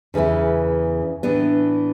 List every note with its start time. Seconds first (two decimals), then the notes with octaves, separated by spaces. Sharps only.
0.14 E2 C#3 E3 B3 E4
1.23 A2 E3 B3 D4